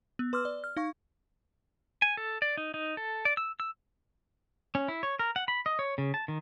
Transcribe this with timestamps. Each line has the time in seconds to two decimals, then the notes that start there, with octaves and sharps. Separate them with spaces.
0.19 B3
0.33 B4 C6 D6 E6 F6
0.45 D5
0.64 F6
0.77 D#4 F5 C#6
2.02 G#5
2.17 A4
2.42 D5
2.57 D#4
2.74 D#4
2.97 A4
3.25 D5
3.37 E6
3.60 E6
4.75 C#4
4.88 E4
5.03 C#5
5.19 A#4
5.36 F#5
5.48 B5
5.66 D#5
5.79 C#5
5.98 C#3
6.14 A5
6.28 D#3